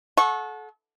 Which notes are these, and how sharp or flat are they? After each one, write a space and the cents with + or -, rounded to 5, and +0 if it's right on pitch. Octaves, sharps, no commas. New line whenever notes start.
A4 -30 F#5 -20 C#6 -25